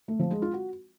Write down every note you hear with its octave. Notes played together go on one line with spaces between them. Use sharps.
A3
F3
G#3
F4
F#4